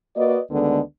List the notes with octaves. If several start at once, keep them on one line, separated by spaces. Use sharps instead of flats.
A#3 F#4 B4 D5 D#5
D2 D3 D#3 G#3 B3 D4